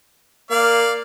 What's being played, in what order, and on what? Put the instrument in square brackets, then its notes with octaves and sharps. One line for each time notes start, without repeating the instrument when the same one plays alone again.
[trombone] A#3 [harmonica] D5 F5